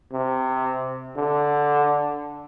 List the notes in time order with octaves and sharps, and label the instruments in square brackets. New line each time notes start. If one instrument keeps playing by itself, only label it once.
[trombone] C3
D3